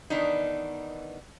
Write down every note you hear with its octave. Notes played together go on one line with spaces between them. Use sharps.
D#3 E3 B3 D4 D#4